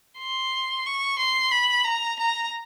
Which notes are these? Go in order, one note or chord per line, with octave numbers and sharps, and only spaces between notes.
C6
C#6
C6
B5
A#5
A#5